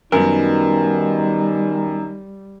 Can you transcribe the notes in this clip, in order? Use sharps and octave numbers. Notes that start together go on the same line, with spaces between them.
F#2 D#3 G3 B3 D#4 F#4 A#4